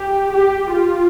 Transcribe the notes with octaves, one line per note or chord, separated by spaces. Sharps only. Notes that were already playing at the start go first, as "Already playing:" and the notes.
Already playing: G4
G4
F4